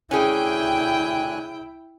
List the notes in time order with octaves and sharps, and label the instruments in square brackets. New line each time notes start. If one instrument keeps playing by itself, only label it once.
[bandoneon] D2 G#5 F#6 [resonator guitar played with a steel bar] C#4 G#4 [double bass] E4 [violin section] G5